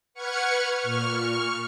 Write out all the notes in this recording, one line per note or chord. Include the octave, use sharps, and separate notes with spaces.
B4 F#5 C#6 F6 G#6 C#7
A#2 C#6 F6